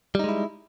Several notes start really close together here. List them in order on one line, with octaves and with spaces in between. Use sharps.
G3 D#4 G#3 E4